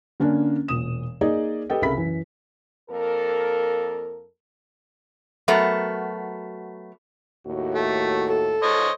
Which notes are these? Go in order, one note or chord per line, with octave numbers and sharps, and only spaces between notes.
D3 A#3 C#4 D4
E1 A#2 D#6 E7
A#3 D#4 G#4 D5 D#5
G4 A4 B4 D#5 G5
C2 C#3 A#4 E5 B5 B6
F#2 E3
F2 A#3 A4 A#4
F#3 A3 B3 F#4 A#4
D#2 A2 F#4
A3
A4
C5 C#5 D#5